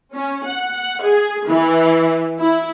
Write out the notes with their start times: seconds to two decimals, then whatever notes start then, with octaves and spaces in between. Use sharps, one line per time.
0.13 C#4
0.45 F#5
1.02 G#4
1.46 E3
2.39 E4